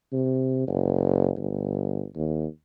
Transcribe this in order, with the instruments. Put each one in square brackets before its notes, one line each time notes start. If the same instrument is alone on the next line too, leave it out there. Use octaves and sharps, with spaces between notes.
[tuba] C3
F#1
G1
D#2